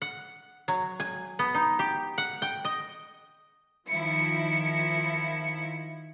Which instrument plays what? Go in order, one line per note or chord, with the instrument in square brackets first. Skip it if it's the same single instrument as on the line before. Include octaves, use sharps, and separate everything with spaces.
[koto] F#5
F#3
G#5
B3
D#4
G4
F#5
G5
D#5
[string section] D#3 F3 E4 C#7